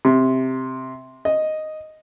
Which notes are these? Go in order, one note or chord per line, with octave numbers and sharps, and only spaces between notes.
C3
D#5